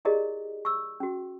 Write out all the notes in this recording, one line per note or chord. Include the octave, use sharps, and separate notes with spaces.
E4 G4 G#4 A#4 D5 D#5
C#6 E6
C#4 F#4